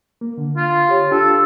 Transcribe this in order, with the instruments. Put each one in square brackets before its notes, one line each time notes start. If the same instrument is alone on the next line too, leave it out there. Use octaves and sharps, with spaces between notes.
[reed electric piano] A#3
D3
[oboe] F4
[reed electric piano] G4 C#5
[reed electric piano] D4 F4 G4 [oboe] A4